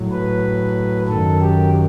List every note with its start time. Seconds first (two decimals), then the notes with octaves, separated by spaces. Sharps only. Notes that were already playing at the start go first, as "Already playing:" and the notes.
Already playing: A2 F#3
0.12 B4
1.08 F#2 D#3 F#3 A4
1.41 G4